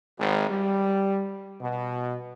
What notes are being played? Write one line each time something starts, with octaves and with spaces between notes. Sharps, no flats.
G#1
G3
B2